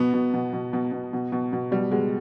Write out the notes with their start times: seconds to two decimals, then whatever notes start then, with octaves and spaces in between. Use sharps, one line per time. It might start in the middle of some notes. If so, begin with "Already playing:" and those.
Already playing: B2 B3
0.14 B2
0.34 B2
0.53 B2
0.73 B2
0.92 B2
1.13 B2
1.32 B2
1.53 B2
1.71 B2 G3
1.91 B2 G#3